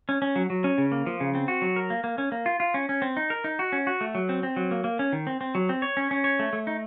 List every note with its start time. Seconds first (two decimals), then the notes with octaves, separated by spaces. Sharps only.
0.09 C#4
0.22 C#4
0.36 F#3
0.50 F#3
0.64 C#4
0.78 C#3
0.92 A#3
1.07 F3
1.20 C#3
1.35 C4
1.48 F#4
1.62 F#3
1.76 A#4
1.90 A#3
2.04 A#3
2.18 C#4
2.32 A#3
2.46 F4
2.60 F4
2.74 C#4
2.89 C#4
3.02 C4
3.17 D#4
3.30 A#4
3.44 D#4
3.59 F#4
3.72 C#4
3.87 F#4
4.01 A3
4.15 F#3
4.29 C4
4.43 C4
4.56 F#3
4.71 A#3
4.84 A#3
4.99 C#4
5.13 D#3
5.27 C4
5.41 C4
5.55 F#3
5.69 C4
5.82 C#5
5.97 C#4
6.11 C#4
6.24 C#5
6.39 A3
6.53 A3
6.67 D#4